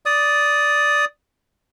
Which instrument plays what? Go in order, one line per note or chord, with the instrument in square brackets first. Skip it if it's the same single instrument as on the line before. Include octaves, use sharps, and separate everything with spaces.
[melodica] D5 D#6